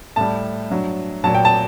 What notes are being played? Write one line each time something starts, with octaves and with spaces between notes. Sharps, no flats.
A2 G3 A5
G2 F#3
A#2 F#3 A5
G5
A5